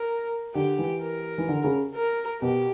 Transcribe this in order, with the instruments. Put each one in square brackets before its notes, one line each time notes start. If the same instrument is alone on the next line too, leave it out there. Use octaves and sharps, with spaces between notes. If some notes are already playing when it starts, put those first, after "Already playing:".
Already playing: [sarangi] A#4
[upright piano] D3 [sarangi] G4
[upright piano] E3
[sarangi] A#4
[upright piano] E3
D3
C#3
[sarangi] A#4
[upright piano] B2 [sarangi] G4